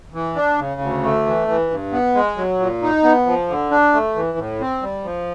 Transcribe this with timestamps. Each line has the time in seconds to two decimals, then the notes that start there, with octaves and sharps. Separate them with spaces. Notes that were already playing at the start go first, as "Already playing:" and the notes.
0.14 E3
0.36 D4
0.59 C#3
0.81 D2
1.03 A3
1.26 E3
1.48 E3
1.70 G2
1.92 B3
2.15 G#3
2.37 F#3
2.60 A#2
2.82 D#4
3.04 B3
3.26 F3
3.49 D3
3.71 D4
3.94 A3
4.15 E3
4.38 A2
4.61 C4
4.82 G3
5.04 F3